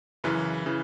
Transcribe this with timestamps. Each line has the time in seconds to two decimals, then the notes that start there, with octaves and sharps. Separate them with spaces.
0.24 F#2 C#3 E3 B4
0.66 C#3 E3